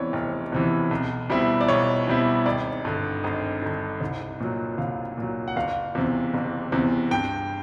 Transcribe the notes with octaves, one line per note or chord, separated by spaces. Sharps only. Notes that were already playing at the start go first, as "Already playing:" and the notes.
Already playing: F1 E2 C3 E3 C#5 D5
F1
E2 C3 E3
B1
B2 G3 C4 E4
D5
B1 C#5
B2 G3 C4 E4
G#1 D5
G2 D3
G#1 D#5
G2 D3
C2
A#2 F#3
C2 F5
A#2 F#3
F#5
F#1 F5
E2 C3
F#1
E2 C3
G2 G5